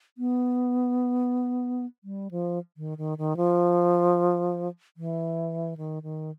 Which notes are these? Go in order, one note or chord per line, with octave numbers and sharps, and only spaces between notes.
B3
G3
F3
D#3
D#3
D#3
F3
E3
D#3
D#3